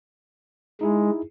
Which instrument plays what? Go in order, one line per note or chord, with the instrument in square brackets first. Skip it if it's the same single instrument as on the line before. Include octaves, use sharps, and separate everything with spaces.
[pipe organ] G#3 [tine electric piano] D#4 E4 G#4